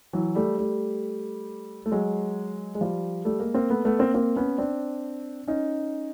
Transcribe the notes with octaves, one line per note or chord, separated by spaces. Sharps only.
E3 F#3
G3 A3
G3 A3
A3
F#3 G#3
G#3
F3 G3
G3 A3
G#3 A#3
A#3 C4
A3 B3
A3 B3
A#3 C4
A#3 C4
B3 C#4
C4 D4
C#4 D#4